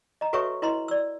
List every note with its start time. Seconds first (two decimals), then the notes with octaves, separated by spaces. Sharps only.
0.21 D#5 A#5
0.33 F#4 A4 B4 C#5 E5 C#6
0.62 E4 B4 D#5 A#5 C6
0.88 D5 E6